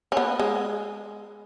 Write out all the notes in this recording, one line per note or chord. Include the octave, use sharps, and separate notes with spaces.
C#4
B3
G#3